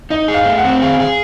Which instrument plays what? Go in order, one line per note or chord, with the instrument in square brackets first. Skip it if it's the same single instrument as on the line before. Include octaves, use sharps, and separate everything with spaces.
[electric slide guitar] D#4 [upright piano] D#5
[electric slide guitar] G#4
[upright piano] F5
[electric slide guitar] A3
[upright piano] F#5
[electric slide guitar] C4
[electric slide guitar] G#4 [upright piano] F5
[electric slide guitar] G#4